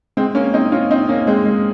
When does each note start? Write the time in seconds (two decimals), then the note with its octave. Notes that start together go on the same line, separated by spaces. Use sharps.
0.17 G#3 C4
0.35 A#3 C#4
0.54 C4 D#4
0.72 C#4 F4
0.91 C4 D#4
1.09 A#3 C#4
1.27 G#3 C4
1.46 G#3